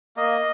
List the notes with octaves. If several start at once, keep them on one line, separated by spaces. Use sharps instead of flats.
A#3 D#5